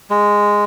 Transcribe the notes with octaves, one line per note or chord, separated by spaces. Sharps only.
G#3